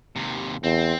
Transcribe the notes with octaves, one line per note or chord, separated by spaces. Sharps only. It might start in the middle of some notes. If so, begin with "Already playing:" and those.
D#2 C3
E2 C4